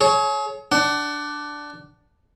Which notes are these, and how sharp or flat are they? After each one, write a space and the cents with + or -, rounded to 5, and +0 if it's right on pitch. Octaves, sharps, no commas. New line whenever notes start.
G#4 +40 C#5 +0
D4 +0 F#5 +30